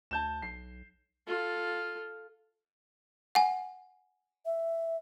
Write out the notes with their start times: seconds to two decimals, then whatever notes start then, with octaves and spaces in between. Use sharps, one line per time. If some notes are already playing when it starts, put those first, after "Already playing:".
0.11 D2 A5 G6 E7
0.42 B1 C7
1.27 F4 A4
3.35 F#5 G#5
4.46 E5